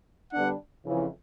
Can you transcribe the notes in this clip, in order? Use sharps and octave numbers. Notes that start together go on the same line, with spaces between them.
D3 G3 B3 D4 F#5
F2 C#3 E3